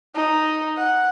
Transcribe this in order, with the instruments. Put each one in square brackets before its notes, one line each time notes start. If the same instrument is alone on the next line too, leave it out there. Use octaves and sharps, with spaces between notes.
[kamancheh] D#4
F#5